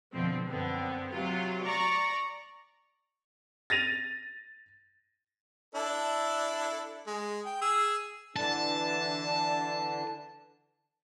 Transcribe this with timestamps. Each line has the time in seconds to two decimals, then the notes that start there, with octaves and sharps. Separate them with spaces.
0.14 F2 B2 D3 F3 C4
0.47 F#2 D3 B3 C4
1.13 C3 F#3 F4
1.65 D5 A#5 C#6
3.70 A6 A#6 D#7 F7
5.75 D4 E4 A4
7.07 G#3
7.45 G5
7.61 G#4 E6
8.36 D3 E3 D4 A5